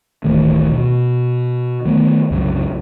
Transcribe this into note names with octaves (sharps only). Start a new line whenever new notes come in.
D1 A1 D#3 A3
B2
D#3 A3 B3
C2 F#2 C#3